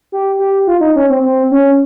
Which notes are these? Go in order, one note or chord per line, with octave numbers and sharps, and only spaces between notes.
G4
G4
F4
D#4
C#4
C4
C4
C#4